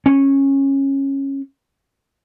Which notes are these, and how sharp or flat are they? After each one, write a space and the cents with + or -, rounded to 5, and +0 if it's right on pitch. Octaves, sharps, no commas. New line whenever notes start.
C#4 -15